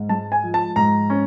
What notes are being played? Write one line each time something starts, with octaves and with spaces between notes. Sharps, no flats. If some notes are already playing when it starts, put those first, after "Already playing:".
Already playing: G#2
G#3 A5
G#5
F3
A5
G#2 A#5
C#4